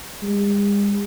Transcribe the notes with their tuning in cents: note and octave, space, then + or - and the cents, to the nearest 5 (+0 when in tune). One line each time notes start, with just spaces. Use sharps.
G#3 -45